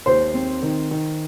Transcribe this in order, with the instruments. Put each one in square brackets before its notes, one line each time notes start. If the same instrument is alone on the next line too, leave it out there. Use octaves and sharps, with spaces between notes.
[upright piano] D#2 [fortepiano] C5
[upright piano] C4
D#3
D#3